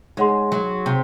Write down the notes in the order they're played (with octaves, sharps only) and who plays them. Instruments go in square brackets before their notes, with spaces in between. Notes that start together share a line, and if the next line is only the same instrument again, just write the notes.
[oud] G#3 [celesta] D#4 G#4 C#5 F#5 C6
[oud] F#3
C3